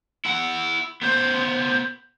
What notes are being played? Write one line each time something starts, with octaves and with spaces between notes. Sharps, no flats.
E4 F#5
B3 C5